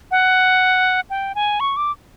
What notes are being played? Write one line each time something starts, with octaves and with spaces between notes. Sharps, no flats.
F#5
G5
G#5
C#6
D6